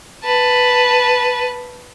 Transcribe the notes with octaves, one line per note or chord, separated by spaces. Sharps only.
B4 A5